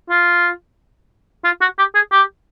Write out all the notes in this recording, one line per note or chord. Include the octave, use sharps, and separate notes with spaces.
F4
F4
F#4
G4
G#4
G4